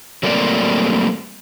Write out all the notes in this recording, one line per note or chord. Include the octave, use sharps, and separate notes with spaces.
F#3 G3 A3 A#3 C4 D5